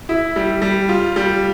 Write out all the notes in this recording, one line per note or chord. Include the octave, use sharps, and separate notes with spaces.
E4
G3
G3
F4
G3